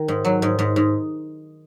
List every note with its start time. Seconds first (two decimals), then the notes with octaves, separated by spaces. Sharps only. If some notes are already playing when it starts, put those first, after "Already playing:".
Already playing: D#3
0.08 G#2
0.25 F#3
0.42 G#2
0.59 G#2
0.76 G#2